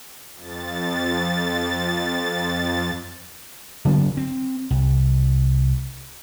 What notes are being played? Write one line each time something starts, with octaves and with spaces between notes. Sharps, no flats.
F2 A6
C#3 F#3 B3 D4
C4
C2